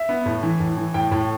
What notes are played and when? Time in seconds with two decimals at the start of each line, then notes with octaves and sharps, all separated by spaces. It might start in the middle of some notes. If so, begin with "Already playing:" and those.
Already playing: E5
0.09 B3
0.26 A2
0.43 E3
0.60 A2
0.77 E3
0.94 A2 G5
1.11 A2